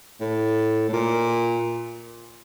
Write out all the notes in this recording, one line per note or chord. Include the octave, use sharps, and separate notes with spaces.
A2
A2
A#2